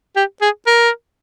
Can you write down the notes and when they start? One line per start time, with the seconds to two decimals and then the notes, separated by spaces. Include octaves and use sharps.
0.16 G4
0.41 G#4
0.67 A#4